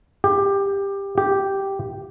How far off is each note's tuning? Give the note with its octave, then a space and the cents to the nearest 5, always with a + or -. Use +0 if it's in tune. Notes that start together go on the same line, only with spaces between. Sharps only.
G4 +15
G4 -5